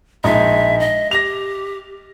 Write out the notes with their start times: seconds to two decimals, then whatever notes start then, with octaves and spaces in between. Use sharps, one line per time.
0.24 A#1 G#3 D#4 E5
0.80 D#5
1.11 G4 A#6 F7